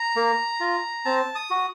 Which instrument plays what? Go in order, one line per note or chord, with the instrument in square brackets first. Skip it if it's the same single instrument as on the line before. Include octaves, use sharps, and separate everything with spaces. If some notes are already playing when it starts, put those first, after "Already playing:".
Already playing: [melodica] A#5
A#3
F4
C4 A5
D#6
F#4